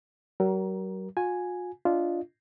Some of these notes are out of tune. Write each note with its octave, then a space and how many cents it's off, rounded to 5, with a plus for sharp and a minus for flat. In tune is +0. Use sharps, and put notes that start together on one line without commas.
F#3 +40 A#4 +15
F4 +45 G#5 +0
D4 -15 F4 -10 D#5 +0